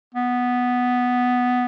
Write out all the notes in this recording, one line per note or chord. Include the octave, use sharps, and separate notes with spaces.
B3